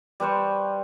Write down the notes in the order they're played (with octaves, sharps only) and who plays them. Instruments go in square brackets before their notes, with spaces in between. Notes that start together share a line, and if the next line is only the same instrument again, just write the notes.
[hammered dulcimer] G3 B4 C5 C#6